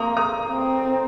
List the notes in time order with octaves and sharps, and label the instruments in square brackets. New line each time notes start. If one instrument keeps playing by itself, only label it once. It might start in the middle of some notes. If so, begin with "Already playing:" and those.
Already playing: [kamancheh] A#3 [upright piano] A#5 C6 D#6
[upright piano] A#5 D#6
[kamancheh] C4